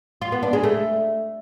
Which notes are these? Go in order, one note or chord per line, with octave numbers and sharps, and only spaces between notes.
F4
B3
D4
G#3
A3